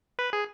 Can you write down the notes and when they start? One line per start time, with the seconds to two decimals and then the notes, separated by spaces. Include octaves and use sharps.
0.19 B4
0.33 G#4